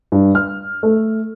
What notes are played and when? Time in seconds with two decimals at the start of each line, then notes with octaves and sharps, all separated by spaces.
0.12 G2
0.35 F6
0.83 A3